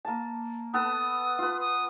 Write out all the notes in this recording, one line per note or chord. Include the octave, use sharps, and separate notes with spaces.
A#3 A5
B3 A4 B4 D#6
F4 B4
D#6